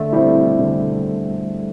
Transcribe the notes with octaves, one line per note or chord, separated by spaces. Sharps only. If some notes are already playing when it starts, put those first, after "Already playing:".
Already playing: D3 A3
G3 C4 E4
D3